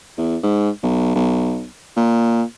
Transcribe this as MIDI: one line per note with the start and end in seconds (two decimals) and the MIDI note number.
0.17 0.37 40
0.43 0.70 44
0.83 1.14 35
1.15 1.66 35
1.97 2.43 46